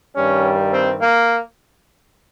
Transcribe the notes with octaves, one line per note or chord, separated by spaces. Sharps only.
G2 D#3 G3 C#4
C4
A#3